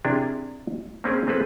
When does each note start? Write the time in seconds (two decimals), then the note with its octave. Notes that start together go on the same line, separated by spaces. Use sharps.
0.04 C3 D4 E4 G#4 A#4
1.04 A#3 C4 C#4 G#4 A#4
1.27 A#3 C4 G#4 A4 B4